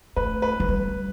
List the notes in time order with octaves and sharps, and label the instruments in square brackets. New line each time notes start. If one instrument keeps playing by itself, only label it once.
[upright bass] A3 [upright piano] B4
[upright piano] B4
[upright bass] F#3
G3